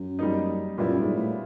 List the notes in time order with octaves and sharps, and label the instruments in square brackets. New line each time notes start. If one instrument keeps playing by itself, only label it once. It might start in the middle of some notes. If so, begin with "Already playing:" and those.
Already playing: [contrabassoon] F#2
[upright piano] G3 A#3 D#4
[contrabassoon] F#2 [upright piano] A#2 G3 B3 E4
[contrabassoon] G#2
A2